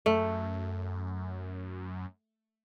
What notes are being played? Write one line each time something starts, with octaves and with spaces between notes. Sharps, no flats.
F#2 A3